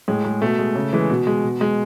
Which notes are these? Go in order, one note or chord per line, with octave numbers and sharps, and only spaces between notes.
A2 G#3
G#3
B2 A3
G#3
C#3
E3 G#3
B2
G#3
B2
G#3